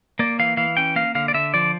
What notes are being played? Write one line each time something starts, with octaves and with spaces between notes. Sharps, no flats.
A#3 D5
E3 F5
E3 F5
C#4 G5
A#3 F5
D3 F5
D5
D3 E5
F3 D5